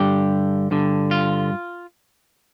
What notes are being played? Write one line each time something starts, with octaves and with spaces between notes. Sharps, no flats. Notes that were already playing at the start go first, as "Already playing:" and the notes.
Already playing: G2 D3 G4
G2 D3
F4